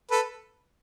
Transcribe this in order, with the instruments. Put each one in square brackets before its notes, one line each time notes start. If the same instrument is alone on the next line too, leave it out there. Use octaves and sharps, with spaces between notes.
[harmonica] A4 B4